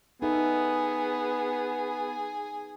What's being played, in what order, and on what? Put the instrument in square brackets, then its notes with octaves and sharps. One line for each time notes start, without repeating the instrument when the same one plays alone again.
[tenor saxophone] B3 [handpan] D#4 A4 E5 [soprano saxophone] G#4